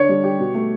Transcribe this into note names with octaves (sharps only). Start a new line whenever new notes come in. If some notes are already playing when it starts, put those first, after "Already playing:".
Already playing: D3 D4 C#5
G3
G4
B2
A3